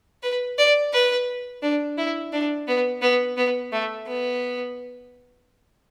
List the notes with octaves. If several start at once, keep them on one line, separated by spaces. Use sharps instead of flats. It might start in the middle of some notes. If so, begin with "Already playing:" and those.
B4
D5
B4
D4
E4
D4
B3
B3
B3
A3
B3